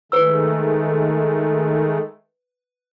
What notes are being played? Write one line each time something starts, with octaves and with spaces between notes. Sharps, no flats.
D#3 G#3 A3 B4 E6